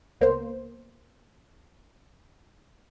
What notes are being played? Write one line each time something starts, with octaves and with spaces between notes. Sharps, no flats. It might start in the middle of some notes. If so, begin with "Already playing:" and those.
C#2 A#3 B3 C5